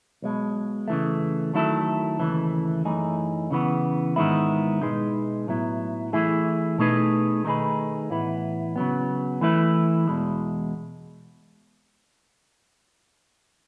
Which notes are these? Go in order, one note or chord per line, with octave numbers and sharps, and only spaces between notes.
B1 B2 G#3
C#3 E3 A3
D#3 F#3 A3 E4 A4
D#2 C#3 E3 A3
F#2 E3 A3 D#4 G#4
C#3 E3 B3
G#2 D#3 G#3 B3 E4
B2 G#3 D#4 G#4 B4
A2 F#3 B3 E4
E3 A3 E4 G#4
B2 A3 D#4 G#4 B4
D#3 A3 D#4 G#4 B4
A2 E3 B3 E4 B4
C#3 F#3 B3
E3 A3 E4 B4
E2 B2 G#3